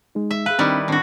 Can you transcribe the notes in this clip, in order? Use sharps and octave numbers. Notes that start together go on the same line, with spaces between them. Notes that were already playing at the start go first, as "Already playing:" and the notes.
G#3 D#4
E5
G#4 B4 F5
D#3 G3 C4 D4 E4
A2 D#3 C4 D4 F#4